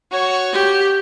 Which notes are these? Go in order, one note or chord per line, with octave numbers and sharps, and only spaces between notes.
F#4 C#5
G4